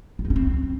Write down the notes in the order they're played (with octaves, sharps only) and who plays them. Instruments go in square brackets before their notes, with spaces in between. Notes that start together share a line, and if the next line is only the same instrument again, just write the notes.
[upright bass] F4
D#4
C#4
C4